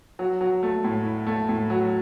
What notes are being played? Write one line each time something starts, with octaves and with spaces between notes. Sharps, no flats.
F#3
F#3
A3
A2
E4
A3
A2
F#3